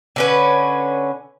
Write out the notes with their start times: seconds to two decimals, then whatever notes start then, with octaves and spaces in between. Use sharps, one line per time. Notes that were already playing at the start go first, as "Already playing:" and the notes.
0.16 D3 C#4 B4